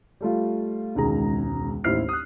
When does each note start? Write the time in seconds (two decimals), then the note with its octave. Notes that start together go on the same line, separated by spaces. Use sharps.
0.20 G3 A3 F4
0.95 E1 C#2 D#3 G#4 A#5
1.84 A1 D#2 E4 C5 F6 C7
2.09 D#6 F#6